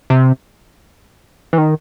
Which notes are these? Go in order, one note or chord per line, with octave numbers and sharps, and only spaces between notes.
C3
E3
D#3